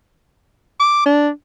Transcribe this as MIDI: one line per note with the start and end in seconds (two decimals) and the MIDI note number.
0.80 1.03 86
1.06 1.29 62